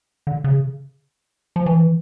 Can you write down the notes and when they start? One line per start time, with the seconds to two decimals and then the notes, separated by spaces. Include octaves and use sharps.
0.27 D3
0.44 C#3
1.56 F3
1.66 E3